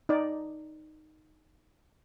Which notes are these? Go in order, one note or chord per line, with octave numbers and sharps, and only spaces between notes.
D#4 D5